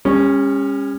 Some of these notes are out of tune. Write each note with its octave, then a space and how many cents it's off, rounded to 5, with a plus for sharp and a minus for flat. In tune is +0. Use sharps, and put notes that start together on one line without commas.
G3 +45 C#4 -10